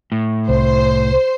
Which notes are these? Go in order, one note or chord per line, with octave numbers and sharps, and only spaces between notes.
A2
C2 C5